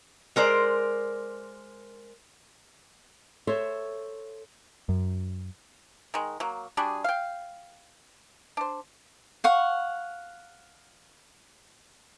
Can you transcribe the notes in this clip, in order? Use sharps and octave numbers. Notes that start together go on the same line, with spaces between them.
G#3 A#4 C5 D5
A4 C5 C#5 E5
F#2
D#3 G#3
F#3 A#3
G3 D4 F#4 G#4
F5 G5
D4 C5
F5 F#5 C#6